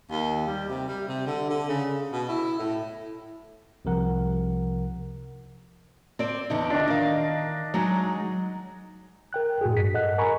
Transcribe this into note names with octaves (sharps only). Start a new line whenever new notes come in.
D#2
G3
C3
G3
C3
D3
D3
C#3
B2
E4
A2
C2 C3 F3 A#4 F#5
C4 D5
E2 D3 D#4
D4 D#5
D#3 F5
F#3 G#3 D#4
A#4 G5 F#6
A2 F#4 G#4
G2 B6
A4 D#5 F#5 F#6
A#4 G#5 A#5 B5 C#6